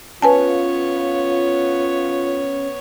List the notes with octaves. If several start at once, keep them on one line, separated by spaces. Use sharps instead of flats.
B3 C#4 F4 B4 C#5 G#5 A5